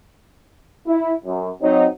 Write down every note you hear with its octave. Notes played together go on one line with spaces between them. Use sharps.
E4
F#2
F#3 C4 D#4